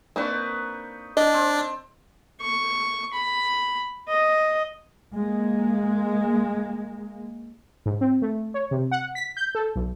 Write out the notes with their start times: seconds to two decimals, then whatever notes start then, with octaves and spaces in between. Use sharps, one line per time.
0.16 A#3 C4 D4 D#4 B4 C#6
1.17 D4 D#5
1.34 C4
2.41 C#6
3.13 B5
4.09 D#5
5.14 G#3 A#3
7.86 G#2
8.01 C4
8.22 A3
8.54 C#5
8.71 C3
8.91 F#5
9.15 B6
9.37 G6
9.55 A4
9.75 B1